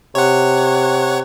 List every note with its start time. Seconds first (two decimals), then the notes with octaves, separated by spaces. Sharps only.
0.15 C3 C#5 F#5